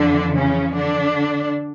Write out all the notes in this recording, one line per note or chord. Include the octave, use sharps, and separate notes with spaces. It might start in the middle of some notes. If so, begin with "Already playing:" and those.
Already playing: F2 D3 E3 D4
C#3 C#4
D3 D4